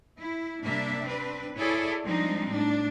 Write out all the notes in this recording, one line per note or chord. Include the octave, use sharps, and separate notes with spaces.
E4
C3 G3 A#3 D4 E5
C4 D4 B4
E4 G#4 A4 C#5 D5
F3 G3 G#3 C4 D4 D#4
A2 D4